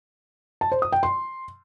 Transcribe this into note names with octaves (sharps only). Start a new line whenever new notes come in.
A5
C5
D#6
G5
C6